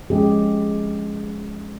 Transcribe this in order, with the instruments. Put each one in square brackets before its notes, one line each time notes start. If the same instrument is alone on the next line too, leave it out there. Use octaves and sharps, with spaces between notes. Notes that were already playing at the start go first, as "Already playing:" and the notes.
[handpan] F3 G#3 C#4 G4 G#4